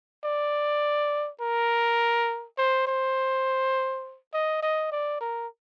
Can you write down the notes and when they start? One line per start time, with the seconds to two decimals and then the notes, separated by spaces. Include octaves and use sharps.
0.25 D5
1.41 A#4
2.58 C5
2.87 C5
4.34 D#5
4.62 D#5
4.92 D5
5.21 A#4